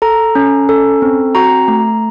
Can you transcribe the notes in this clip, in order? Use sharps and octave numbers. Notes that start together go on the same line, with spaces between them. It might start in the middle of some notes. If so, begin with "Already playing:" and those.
A4 A#5
C#4
A4
C4
F#4 A#5
A3